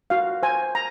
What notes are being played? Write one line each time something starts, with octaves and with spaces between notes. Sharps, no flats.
F#4 F5
C5 G#5
A#5